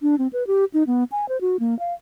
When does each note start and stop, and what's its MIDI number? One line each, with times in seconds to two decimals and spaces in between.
0.02 0.15 62
0.18 0.27 60
0.33 0.46 71
0.47 0.65 67
0.74 0.83 63
0.87 1.04 59
1.12 1.28 80
1.29 1.40 72
1.41 1.57 66
1.60 1.77 58
1.79 1.94 77